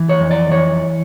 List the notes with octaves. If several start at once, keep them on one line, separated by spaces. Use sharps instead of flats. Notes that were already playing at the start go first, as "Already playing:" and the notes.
Already playing: E3
C#5
F2
D5
E3 C#5